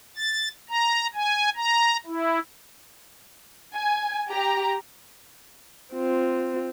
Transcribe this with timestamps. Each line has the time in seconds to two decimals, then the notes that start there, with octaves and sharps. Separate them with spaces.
0.17 A6
0.70 A#5
1.15 G#5
1.57 A#5
2.06 E4
3.75 G#5
4.30 G4 A#5
5.93 C4 F4